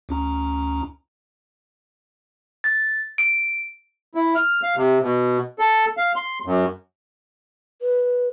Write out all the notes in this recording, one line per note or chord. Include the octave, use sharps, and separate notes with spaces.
D2 C#4 A#5
A6
D7
E4
F6
F5
C3
B2
A4
F5
C6
F#2
B4